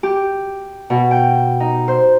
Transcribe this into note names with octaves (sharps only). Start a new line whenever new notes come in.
G4
B2
G5
D#4
C5